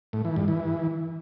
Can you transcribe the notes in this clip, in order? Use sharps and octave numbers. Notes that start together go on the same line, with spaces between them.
A2
E3
G2
E3